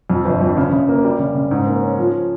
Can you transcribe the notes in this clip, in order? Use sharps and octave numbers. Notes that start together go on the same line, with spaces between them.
F2
G1
F2
C#3
C#3
A#3
G3
C#3
C#3
G#2
A#3
C#4
F3